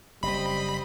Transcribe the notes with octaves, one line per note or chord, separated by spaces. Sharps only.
F#1 G3 C4 D#5 B5